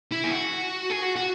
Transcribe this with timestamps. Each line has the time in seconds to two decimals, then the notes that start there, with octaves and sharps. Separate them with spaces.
0.11 E4
0.24 G#4
0.31 F#4
0.90 G#4
1.02 F#4
1.15 F#4